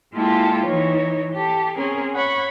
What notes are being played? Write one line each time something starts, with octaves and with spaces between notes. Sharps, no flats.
G#3 A#3 E4 F4 G4 A4
E3 D#4 C#5
G4 A4
C4 C#4 G#4 A#4
C#5 F#5 B5 C#6